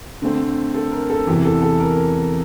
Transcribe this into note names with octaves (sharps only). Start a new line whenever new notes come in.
D3 A3 C4
A4
A#4
A4
E2 C3 E3 G4
A4
A4
A#4